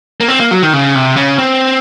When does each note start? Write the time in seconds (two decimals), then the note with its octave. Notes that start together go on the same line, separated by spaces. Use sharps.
0.20 A#3
0.28 C4
0.40 A#3
0.51 F#3
0.62 D#3
0.73 C#3
0.95 C3
1.17 C#3
1.38 C4